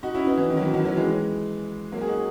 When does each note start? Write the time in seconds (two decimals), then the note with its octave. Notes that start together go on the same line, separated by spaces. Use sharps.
0.03 D#4 F#4
0.14 C#4 E4
0.26 B3 D#4
0.37 E3
0.50 D#3
0.57 F#3
0.62 E3
0.74 D#3 F#3
0.85 D#3 F#3
0.97 E3 G#3
1.92 F#3 A#3
2.01 G#4
2.08 D#4 F#4